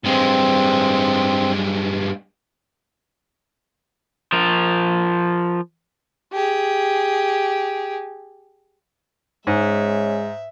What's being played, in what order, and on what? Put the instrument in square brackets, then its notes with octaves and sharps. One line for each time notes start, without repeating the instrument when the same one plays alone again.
[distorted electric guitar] G2 G#3 [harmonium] C4
[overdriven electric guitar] F3 A#4
[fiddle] G4 G#4
[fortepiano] G#2 [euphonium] G#3 [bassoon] C#4 [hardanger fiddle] E5